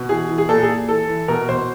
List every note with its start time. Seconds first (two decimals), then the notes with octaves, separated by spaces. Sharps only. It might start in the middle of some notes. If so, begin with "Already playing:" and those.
Already playing: B2
0.09 E3 G#4
0.29 E3
0.38 G#4
0.49 A#2 A4
0.63 G#4
0.69 A#2
0.89 E3 A4
1.08 E3
1.28 B2 A#4
1.49 B2 C5